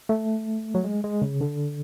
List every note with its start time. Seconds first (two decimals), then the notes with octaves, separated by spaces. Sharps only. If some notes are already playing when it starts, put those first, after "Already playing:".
0.09 A3
0.75 F#3
0.84 G#3
1.04 G#3
1.22 C#3
1.41 D3